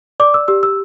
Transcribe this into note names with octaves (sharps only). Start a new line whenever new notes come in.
D5 D6
E6
G4 E6
E6